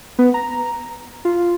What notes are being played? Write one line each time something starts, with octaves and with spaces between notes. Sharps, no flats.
B3
A#5
F4